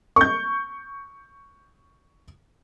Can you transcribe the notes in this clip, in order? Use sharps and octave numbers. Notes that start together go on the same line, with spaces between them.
C#6 G6